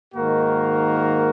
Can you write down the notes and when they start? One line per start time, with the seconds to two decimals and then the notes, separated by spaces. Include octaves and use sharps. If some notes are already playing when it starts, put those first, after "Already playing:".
0.14 G#2 D#3 A#3 F#4 A#4